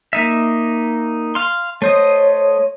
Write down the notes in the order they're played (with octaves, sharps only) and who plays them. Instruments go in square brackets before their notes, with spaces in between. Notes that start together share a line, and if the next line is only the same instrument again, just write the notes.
[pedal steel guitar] A#3 D#4 E5
F5 C6
[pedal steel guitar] A3 C5 D#5 [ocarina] C#5